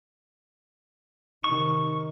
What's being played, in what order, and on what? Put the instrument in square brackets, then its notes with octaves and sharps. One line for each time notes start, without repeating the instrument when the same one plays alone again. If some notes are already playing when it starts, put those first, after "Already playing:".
[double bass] C3 D#3 [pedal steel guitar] C#6